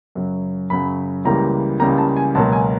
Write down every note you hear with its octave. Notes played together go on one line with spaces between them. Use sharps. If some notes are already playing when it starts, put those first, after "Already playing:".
F#2 C#3 F#3
F#2 C#3 F#3 B5
C#2 C#3 E3 G3 A#3 A#5
C#2 C#3 E3 G3 A#3 A#5
A5
G#5
C#2 B2 F#3 A#3 A5
G#5